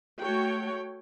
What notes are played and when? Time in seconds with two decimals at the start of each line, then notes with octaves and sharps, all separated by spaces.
0.20 A3 F#4 C#5 G5